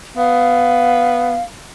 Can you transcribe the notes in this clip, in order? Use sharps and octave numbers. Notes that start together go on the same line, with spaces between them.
B3 F5